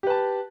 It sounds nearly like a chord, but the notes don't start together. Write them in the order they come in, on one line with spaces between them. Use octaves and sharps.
G4 B4 A5